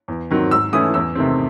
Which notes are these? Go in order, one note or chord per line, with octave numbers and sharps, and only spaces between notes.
E2
D#3 F#3 C4
G#2 E6
E3 A3 C#4 E4 D#6
E2 E6
C3 D#3 A3 C4